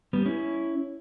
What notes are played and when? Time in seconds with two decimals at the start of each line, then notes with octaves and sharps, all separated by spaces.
0.13 G3 B3
0.25 C#4 E4